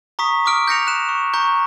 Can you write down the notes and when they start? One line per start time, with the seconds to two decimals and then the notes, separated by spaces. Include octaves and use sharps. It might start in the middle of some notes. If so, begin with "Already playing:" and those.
0.19 A#5 C#6 D#6 B6
0.46 D6 D#6 F6 D7
0.68 G6 A#6 C#7 F7
0.87 F#6 E7
1.09 C#6
1.34 A#5 C#6 G6